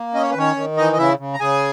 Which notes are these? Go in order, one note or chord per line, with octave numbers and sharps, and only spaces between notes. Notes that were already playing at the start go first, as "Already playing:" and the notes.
Already playing: A#3
C#4 D#5
C#5
B4
D#3 C#4 C#5
D#3
E3 D#4 D#5
D#5
C#3 E4 E5
C#3
A#5
C#3 G#4 G#5